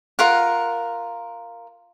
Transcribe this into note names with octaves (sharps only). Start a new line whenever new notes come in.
F4 A#4 F#5